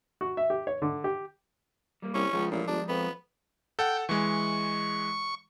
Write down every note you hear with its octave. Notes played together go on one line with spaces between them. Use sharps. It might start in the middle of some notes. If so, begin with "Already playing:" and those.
F#4
E5
G4
C#5
D3
G4
G3 A#3
C2 C#4
C#2 F3 G#3
A1 A#2
G1 D4
F2 B3
A4 F#5 G5
E3 G#3 C#6